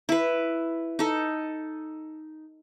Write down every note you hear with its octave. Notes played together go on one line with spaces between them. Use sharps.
E4 B4
D#4 A4